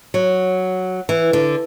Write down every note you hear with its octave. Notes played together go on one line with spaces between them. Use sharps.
F#3
E3
D3